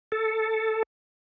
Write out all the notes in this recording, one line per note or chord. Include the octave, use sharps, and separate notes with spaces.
A4